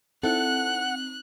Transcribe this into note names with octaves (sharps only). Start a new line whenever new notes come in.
C4 D#4 E4 A4 F#5 F#6